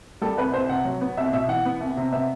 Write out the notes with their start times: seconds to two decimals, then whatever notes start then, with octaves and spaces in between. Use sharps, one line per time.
0.21 G3 A4
0.37 C2 B4
0.53 C2 C5
0.69 C3 F#5
0.85 F#3
1.01 B3
1.17 C2 E5
1.32 B2 E5
1.48 E3 F#5
1.65 B3
1.81 C2
1.97 C3
2.12 B3 E5